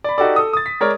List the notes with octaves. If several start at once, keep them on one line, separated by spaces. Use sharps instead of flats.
D5 B5
D#4 F#4 G4 A4 D5
A4 D#6
D#6 A6
B6
G#3 A#4 C#5 D5